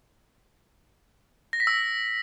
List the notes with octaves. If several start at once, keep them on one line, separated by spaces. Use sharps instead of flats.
A#6
B6
E6